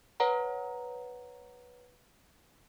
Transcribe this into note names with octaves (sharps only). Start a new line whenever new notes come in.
B4 C#5 F#5 A#5